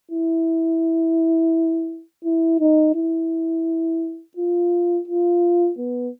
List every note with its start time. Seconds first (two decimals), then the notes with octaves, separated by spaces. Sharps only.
0.11 E4
2.24 E4
2.60 D#4
2.95 E4
4.37 F4
5.08 F4
5.78 B3